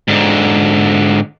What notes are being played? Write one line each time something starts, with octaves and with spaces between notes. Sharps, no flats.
G#2 D3